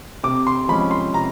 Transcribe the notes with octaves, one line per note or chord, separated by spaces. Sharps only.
C3 D6
C6
F3 G#3 C#4 B5
C6
C3 A#5